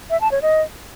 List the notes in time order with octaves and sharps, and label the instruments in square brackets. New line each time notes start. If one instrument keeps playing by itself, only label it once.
[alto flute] E5
A5
C#5
D#5